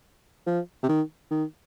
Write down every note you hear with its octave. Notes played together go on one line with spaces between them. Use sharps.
F3
C3
D#3
D#3